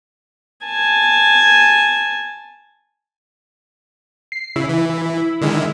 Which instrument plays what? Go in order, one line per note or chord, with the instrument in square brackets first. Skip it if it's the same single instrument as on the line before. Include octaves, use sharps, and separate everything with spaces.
[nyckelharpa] G#5 A5
[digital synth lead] C7
[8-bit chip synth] C#3 [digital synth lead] E4
[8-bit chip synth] E3
D3 D#3 G#3